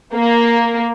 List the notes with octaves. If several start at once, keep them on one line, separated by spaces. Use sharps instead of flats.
A#3